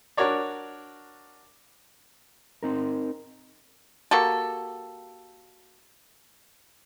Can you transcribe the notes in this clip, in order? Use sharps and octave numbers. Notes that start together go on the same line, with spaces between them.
D4 F#4 A#4 C#5 D5
C4 D#4 A#4
A#3 F#4 G4 A4